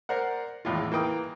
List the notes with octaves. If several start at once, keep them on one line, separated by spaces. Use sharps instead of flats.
A#4 C5 D5 F#5
G#1 E2 A2 F4
E3 A#3 G5 D#6